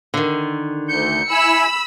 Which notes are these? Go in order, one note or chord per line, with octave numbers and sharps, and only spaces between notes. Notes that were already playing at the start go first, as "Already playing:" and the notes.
D3 D#3
D2 G6 C#7
E4 G#5 B5 E6